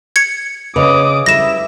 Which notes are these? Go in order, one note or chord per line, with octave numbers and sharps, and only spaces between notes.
G#6 C#7
C#3 B4 C#5 D#5 D6 D#6
G3 E4 A#4 E5 A#6 E7